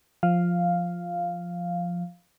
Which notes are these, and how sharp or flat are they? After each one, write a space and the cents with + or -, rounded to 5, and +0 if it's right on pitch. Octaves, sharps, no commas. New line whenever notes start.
F3 +5 F5 +0